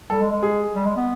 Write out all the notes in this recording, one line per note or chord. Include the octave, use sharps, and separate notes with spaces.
G3 A4
G#3
G#3
G#4
G3
G#3
B3